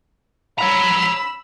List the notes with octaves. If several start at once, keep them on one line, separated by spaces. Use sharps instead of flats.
C#5 A#5 B5 E6